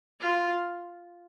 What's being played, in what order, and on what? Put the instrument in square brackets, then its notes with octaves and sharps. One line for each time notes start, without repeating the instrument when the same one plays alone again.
[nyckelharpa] F4